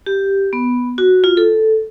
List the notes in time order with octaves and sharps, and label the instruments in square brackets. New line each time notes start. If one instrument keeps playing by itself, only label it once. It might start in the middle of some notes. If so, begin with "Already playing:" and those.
[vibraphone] G4
B3
F#4
F4
A4